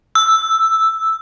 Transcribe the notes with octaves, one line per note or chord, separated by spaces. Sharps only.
E6